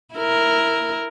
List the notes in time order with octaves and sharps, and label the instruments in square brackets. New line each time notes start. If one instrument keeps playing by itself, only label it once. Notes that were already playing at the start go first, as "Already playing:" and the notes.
[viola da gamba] E4 A#4